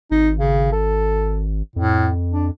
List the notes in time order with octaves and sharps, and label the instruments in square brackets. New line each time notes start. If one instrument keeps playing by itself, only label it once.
[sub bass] G#1 [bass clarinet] D#4
[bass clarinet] C#3
A4
[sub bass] F2 [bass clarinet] A2
[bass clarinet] D4